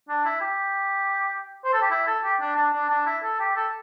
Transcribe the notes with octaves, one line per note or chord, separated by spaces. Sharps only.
D4
E4
G4
C5
A4
G4
E4
A4
G4
D4
D4
D4
D4
E4
A4
G4
A4